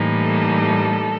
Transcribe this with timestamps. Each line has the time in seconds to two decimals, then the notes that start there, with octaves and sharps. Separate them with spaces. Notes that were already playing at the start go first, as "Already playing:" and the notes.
Already playing: A2 E3 G3 A#3 D#4
0.21 A4